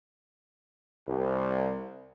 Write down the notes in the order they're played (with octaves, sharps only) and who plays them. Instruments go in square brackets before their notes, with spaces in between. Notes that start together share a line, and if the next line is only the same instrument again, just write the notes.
[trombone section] C2